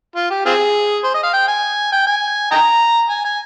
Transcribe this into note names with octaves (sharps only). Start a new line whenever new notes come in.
F4
G4
C4 F4 G#4
C5
D#5
F5
G5
G#5
G5
G#5
D#5 G5 A#5
G#5
G#5